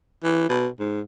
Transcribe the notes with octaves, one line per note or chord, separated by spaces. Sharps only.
E3
B2
G#2